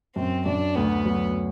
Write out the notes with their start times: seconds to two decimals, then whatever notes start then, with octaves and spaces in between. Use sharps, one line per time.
0.16 F#2 C4
0.46 F#2 D4
0.76 D2 B3
1.06 F#3